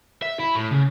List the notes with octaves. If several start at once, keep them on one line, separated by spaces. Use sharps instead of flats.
E5
E4
A2
C#3